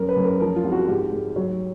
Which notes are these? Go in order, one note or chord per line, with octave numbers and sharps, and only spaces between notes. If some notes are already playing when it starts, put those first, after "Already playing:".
Already playing: F#2 A#4
B4
F#2
A#4
F3 A#4
F4
C2
F#4
G#2 G4
G#2
F#3